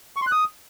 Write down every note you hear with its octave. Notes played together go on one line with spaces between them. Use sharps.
C#6
C6
F#6
D#6